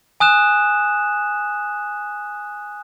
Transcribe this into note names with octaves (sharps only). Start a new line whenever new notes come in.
G#5 D#6 F#6 E7